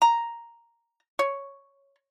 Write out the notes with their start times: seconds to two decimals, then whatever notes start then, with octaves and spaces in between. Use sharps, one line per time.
0.02 A#5
1.19 C#5